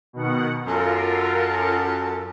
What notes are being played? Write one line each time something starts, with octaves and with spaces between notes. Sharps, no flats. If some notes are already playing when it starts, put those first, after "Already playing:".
B2 D#3 F#5
F#2 F4 A4 A#4